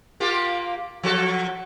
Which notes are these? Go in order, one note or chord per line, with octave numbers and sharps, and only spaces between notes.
A#3 F4 G4
F3 F#4 A4